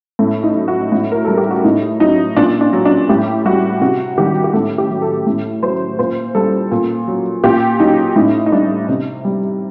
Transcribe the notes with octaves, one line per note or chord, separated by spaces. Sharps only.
A2 A4
D#4
F#3
F#4
A2
A#4
G3 A4
G4
F#4
A2 D#4
F#3 D#4
A#2 D4
D4
F#3
D4
A2 G4
G3 F#4
C3 F#4
D#3 G3 G4
G4
A2 A4
G4
F#3
A4
A2
F#3 C5
A#2 C5
G3 A4
A#2
F#3
A#2 G4
F#3 D#4
A2 D#4
D#4
G3 D4
C3
G3